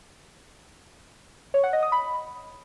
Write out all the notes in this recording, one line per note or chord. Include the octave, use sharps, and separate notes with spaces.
C#5
F#5
D#5
D#6
B5